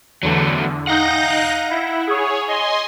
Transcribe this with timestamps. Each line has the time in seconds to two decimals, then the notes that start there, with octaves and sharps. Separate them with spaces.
0.23 E2 D3 F#3 A3
0.87 D#4 F5 F#5 G6 A#6
1.70 E4
2.07 G#4 C#5
2.48 D#5 G#5 C6